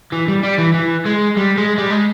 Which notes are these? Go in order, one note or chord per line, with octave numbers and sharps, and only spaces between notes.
E3
G3
G3
E3
E3
G#3
G3
G#3
G3
G#3